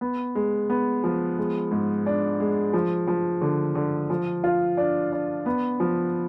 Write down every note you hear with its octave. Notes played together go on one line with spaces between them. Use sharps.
B3
G#3
B3
F3
G#3
G#2
D4
G#3
F3
F3
D3
D3
F3
F4
D4
D4
B3
F3